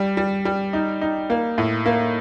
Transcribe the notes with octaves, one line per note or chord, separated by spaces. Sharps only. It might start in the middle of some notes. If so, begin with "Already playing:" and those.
Already playing: G3
G3
G3
D#4
D#4
A#3
A2
A#3